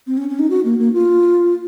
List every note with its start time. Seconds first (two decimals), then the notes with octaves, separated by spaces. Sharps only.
0.07 C4
0.17 C#4
0.29 C#4
0.39 D#4
0.50 F#4
0.65 A#3
0.79 A#3
0.93 F4